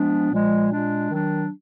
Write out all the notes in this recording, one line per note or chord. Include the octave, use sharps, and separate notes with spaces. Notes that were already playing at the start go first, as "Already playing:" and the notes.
Already playing: F3 G#3 B3 D4
A#2 F3 G#3
A#2 G#3 D4
D#3 F#3 D4